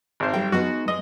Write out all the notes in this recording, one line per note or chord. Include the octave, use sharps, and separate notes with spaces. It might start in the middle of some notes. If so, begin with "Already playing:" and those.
G#1 C5
G3 A4 G5
G#3 B3 D#4 F#4
G#3 D#5